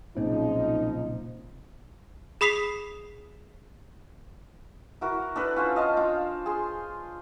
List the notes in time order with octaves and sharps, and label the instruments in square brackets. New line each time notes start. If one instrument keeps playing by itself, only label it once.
[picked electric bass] B1 A#2 C4 [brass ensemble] C#3 F3 D#4
[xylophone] G#4 B5 D#6 B6 C7 F7
[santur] E4 F#4 A#4
D4 A4 B4
C#4 F4 C5
D#5 F5 A5
D4 F4
G#4 C6